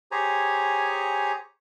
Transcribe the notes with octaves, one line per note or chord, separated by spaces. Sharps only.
G4 G#4 C5 C#5 G#5 A#5